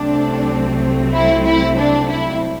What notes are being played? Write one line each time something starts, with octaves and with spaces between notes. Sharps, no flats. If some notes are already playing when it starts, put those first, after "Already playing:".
Already playing: C2 C3 F#3 A3 C4 D4
E4
E4
D4
E4